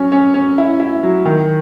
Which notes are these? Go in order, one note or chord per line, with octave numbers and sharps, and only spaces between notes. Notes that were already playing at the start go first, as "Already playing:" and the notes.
Already playing: F#3 C#4
C#4
C#4
E4
E4
F#3
D#3